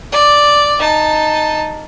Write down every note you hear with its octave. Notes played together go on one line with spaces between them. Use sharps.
D5
D#4 A5